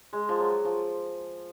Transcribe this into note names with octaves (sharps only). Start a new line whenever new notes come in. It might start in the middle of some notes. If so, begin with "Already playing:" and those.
G#3
F3
F#3
F3